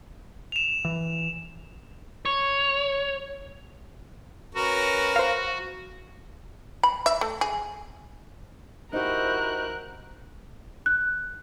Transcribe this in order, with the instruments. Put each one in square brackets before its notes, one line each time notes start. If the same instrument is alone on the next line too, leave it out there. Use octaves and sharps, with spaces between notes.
[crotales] E7 F7
[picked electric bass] E3
[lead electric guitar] C#5
[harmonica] C#4 A#4 B4 [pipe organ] F#4
[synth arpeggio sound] C5 F5
[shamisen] B5
E5
A3
G#4
[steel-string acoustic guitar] D#4 G4 [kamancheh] E4 F#4 [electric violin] A#4 F#6 [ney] C5
[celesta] F#6